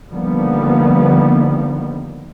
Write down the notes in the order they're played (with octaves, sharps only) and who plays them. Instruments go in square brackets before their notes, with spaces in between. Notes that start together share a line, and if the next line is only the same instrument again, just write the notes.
[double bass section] D3 D#3 F3 G3 A#3 B3